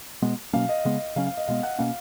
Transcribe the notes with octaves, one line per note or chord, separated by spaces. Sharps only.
B2 G#3 B3
B2 F#3 A#3 C#4 F5
D#5
C#3 G#3 B3
C#3 F#3 C#4 F5
F5
D#5
B2 G#3 B3 F5
F#5
B2 A#3 C#4 F5